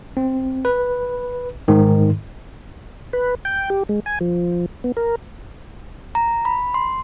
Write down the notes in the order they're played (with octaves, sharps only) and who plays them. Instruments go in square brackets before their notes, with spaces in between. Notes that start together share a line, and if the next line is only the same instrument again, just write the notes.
[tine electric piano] C4
B4
G#2 D#3
[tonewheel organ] B4
G5
G4
G#3
G#5
F3
B3
A#4
[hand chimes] A#5
B5
C6